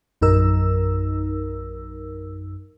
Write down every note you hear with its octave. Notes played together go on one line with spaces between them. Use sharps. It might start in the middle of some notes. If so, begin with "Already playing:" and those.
A#1 F#2 D#4 A#4 E6